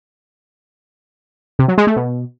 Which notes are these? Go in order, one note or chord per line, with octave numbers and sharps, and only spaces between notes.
C3
F#3
G#3
A3
B2